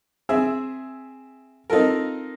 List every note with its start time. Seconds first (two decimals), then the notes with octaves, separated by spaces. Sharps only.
0.29 C4 G#4 E5
1.70 C4 D#4 F4 A4 A#4